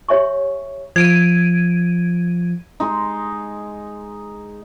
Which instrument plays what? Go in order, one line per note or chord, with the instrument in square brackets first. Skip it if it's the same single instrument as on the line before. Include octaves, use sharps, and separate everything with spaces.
[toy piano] G4 C#5 E5 G#5 C#6
[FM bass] F3 [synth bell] G#6 D7 D#7
[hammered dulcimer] G#3 D#4